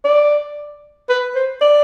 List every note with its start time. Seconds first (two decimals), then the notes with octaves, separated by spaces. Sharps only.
0.05 D5
1.09 B4
1.35 C5
1.61 D5